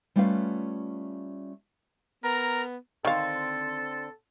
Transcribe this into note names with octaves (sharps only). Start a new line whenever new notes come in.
G3 A3 C#4 F4 B4 F5
B3 A#4 A#5
D3 D#3 C4 A4 F5